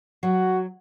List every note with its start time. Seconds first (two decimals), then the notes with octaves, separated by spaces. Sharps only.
0.23 F#3 F#4